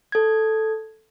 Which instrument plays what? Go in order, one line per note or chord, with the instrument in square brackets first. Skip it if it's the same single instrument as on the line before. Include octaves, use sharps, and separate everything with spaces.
[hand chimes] A4 G#6